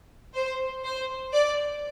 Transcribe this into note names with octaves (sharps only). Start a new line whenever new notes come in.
C5
C5
D5